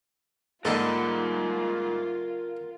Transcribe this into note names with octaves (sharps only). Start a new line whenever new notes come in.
G#2 D3 A#3 D#4 F4 A4 A#4 F#5